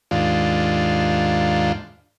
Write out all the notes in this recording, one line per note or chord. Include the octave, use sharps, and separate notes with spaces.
D#2 G#2 D4 F4